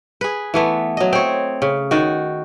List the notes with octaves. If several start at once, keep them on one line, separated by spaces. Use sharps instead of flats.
G#4 B4
E3 A3 B3
F#3 D#5
C4 C#5
C#3
D#3 F#4